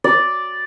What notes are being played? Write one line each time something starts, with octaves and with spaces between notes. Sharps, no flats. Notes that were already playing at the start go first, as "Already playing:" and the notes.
D5